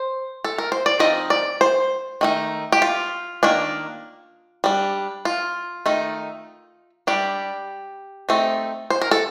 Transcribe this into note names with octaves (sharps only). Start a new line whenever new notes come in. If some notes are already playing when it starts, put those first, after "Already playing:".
Already playing: C5
A4
A#4
C5
D5
F3 C4 D#4 D#5
D5
C5
D#3 A3 D#4
G4
F4
D#3 A#3 D4
G3 D4
F4
D#3 A3 D#4
G3 D4 G4
A3 C4 D#4
C5
A#4
A4